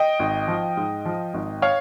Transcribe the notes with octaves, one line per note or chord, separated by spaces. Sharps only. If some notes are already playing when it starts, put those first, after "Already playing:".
Already playing: D#5 G5
G#1
F3
G#2
F3
G#1
C#5 F5